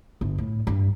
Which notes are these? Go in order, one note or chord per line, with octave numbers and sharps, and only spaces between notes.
G1
A2
G2